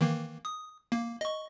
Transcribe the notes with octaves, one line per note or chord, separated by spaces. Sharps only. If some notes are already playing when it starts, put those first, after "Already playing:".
D#3 E3 A#3
D#6
A#3
D#5 C#6